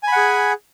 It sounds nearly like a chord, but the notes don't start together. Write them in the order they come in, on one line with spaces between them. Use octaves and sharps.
G#5 B5 F#5 G#4